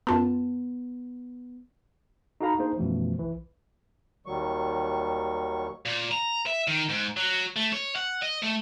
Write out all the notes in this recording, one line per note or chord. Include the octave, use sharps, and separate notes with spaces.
F#2 B3 F4 A5
D#4 F#4 A4 F5 A#5 B5
A#3 D4 D#4 G#4 C5
F#2 B2 E3 F3 A3
B1 E3
D#2 D#3 F#3 G3 C#6
A#2
A#5
E5
D#3
G#2
F#3
A3
C#5
F#5
D#5
A3